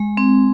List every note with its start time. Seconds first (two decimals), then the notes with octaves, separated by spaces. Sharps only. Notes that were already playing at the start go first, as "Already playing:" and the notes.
Already playing: G#3
0.17 C4